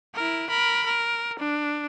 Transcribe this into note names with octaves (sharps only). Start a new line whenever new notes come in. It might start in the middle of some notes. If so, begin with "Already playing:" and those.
E4 A#4
A#4 B5
A#4
D4